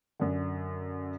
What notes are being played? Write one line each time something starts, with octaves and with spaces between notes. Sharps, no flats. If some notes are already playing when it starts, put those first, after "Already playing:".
F#2 D3